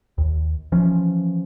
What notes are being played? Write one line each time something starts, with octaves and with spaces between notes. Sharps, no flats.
D#2
E3 F3 C#4